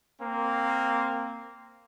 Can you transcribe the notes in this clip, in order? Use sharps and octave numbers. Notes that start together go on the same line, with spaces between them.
A#3 C4